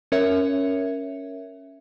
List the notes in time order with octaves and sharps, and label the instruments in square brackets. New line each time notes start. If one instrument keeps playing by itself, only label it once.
[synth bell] C#4 A#4 C#5 E5